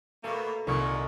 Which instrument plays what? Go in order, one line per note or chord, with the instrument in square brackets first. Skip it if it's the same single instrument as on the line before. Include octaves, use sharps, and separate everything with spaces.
[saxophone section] B2 A3 A#3 [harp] A4
[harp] C2 C#6 G#6 [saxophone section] A#2 D#3